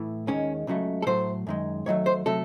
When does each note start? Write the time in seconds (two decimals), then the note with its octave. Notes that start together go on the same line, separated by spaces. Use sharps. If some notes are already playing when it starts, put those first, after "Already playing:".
Already playing: A2 E3
0.27 D#2 D#3 G#3 C#4
0.67 C#2 C#3 F#3 A3
1.02 A4
1.07 A2 F#3 A3 C5
1.47 F#2 D#3 G#3
1.86 D#2 D#3 F#3 A3 C#5
2.06 C5
2.26 C3 F#3 A3 A4